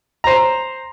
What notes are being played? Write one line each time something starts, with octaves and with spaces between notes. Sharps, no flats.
C5 A#5